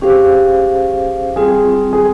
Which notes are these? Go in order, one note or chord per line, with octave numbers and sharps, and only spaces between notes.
C#4 G4 G#4 C5 F5
G3 C4 F4 G#4
G#4